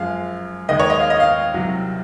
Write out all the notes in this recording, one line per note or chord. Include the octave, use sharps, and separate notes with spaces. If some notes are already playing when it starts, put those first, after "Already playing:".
Already playing: F#2 F3 G#3 F5
D#2 D#3 G#3 D#5
C#5
D#5
F5
D#5
F5
C2 C3 F#3